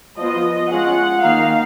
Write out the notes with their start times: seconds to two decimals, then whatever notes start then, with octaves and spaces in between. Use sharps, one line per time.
0.18 F3 B3 F4 D#5
0.71 G#3 C#4 F4 F#5
1.22 D#3 A#3 D#4 F5